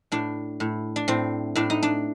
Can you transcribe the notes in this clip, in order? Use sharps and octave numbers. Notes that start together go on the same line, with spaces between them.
A2 D4
A2
D4
A2 C4
A2 D4
D#4
D4